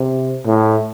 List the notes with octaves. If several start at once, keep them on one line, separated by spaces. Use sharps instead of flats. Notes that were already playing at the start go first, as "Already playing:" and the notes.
Already playing: C3
A2